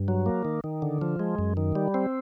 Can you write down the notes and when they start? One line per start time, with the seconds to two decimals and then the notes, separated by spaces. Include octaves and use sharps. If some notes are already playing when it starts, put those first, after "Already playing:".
Already playing: G2
0.08 F#3
0.26 A#3
0.45 D#3
0.64 D#3
0.82 D3
1.02 F3
1.20 G#3
1.39 F#2
1.57 D#3
1.75 G3
1.94 C4